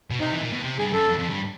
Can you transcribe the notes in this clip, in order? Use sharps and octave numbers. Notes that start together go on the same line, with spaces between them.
B2
C3 D#4
E3
A#2
B2
C3
G2 G#4
F#2 A4
F2
F2
G2